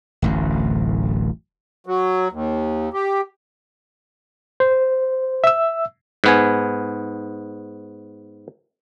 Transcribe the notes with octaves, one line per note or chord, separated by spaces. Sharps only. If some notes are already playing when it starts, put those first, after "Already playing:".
D1 A1 F#2
F#3
D#2
G4
C5
E5 E6
G#2 B3 G#5